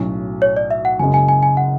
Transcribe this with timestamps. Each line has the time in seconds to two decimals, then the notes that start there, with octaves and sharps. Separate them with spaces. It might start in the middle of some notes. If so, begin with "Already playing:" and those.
Already playing: B1 A2 F#3 C#4
0.42 C#5
0.57 D5
0.71 E5
0.85 F#5
0.99 F#1 F#2 C#3 G#3 G#5
1.14 G#5
1.29 G#5
1.43 G#5
1.57 F#5